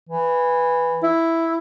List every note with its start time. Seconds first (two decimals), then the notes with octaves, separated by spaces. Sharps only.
0.09 E3
1.03 E4